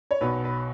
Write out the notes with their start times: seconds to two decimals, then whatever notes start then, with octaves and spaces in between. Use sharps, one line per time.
0.11 C#5
0.21 B1 B2 B4
0.44 B4